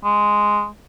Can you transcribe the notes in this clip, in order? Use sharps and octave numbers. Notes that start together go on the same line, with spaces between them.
G#3